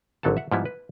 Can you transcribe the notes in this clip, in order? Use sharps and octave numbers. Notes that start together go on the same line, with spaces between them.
G#1 D3 F#3 A4 F#5 A5
E5 F#5
G#2 F3 G3 B3 E4
B4